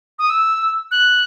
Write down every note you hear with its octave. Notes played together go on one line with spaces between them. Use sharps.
D#6
E6
F#6